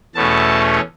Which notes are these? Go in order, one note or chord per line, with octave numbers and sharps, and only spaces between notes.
E2 B2 A3 C#4 A5